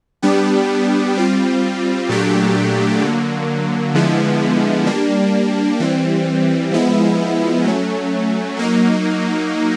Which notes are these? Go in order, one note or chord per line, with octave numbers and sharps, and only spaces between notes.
G3 B3 D4 G4
G3 C4 F4
A#2 F#3 A3 D4 G4
D3 F#3 A#3
D3 F3 G#3 B3 E4
G3 A#3 D4
E3 G3 C4
F3 G#3 B3 E4
F#3 A3 C#4
F#3 A#3 D#4